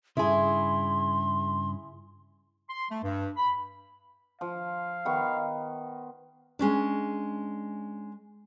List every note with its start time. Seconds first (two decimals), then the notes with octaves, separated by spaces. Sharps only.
0.17 G2 C#3 E4 G#4 C6
2.69 C6
2.90 A3
3.03 G2
3.37 B5
4.41 F3 F5
5.05 D#3 B3 C#6
6.59 G#3 C#4 D4